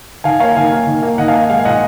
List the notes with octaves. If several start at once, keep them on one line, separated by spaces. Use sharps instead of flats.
D#3 F5 G#5
A#3 C#5 F5
D#3 F5 G#5
A#3
D#3
A#3
D#3 D#5 F#5
F5 G#5
A#3
G#3 F5 G#5
F5
A#2 D#5 F#5